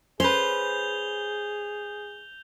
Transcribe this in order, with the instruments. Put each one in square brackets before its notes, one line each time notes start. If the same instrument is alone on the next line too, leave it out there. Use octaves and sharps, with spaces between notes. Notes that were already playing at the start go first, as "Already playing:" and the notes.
[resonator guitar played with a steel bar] C#4 B4 [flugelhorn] G#4 [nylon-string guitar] C5 [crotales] G6 F7 G7